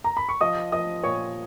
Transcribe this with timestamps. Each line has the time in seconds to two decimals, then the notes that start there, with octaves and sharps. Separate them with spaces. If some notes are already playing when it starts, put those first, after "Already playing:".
0.04 A#5
0.17 B5
0.29 C#6
0.41 F3 D#5 D#6
0.72 F3 D#5 D#6
1.04 A#2 C#5 C#6